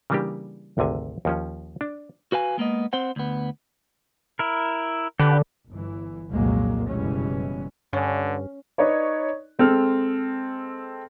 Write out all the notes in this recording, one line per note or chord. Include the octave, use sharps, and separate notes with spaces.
C#3 E3 G3 A#3 D4 G4
G#1 D2 C3 G#5
D#2 F3 C#4
D4
F#4 B4 F5 G#5
G#3 A#3 B3 D#5
C4 C5 F#5
D2 B3
E4 A#4
D3 G4 B4
G1 E3
C2 F2 A#2 F#3 G#3 A#3
F#1 B2 E3 G3 G#3 C#4
G2 D3 C#4
D#4 B4 C#5 D5
G#3 C4 A4 F6